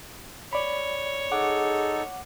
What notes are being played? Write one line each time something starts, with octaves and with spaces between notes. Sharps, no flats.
C#5 D5 B5
D#4 G#4 A4 F#5 D6